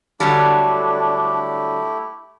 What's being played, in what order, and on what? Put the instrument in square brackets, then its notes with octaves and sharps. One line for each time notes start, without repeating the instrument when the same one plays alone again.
[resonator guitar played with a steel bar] D3 F#3 G3 [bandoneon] A3 E4 G4 [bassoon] D4